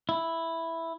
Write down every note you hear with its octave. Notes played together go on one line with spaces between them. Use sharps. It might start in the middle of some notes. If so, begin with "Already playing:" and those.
E4